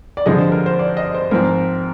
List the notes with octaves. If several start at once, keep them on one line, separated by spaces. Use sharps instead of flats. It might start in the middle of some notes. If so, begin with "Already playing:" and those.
D5
G2 D3 F3 G#3 D#5
C5
A#4
C5
D5
D#5
C5
G#2 F3 C4 A#4